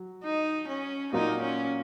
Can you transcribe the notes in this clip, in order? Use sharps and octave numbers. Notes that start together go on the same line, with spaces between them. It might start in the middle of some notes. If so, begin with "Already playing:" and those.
Already playing: F#3
D#4
C#4
A#2 F#3 A#3 D#4 F4 A#4
C#4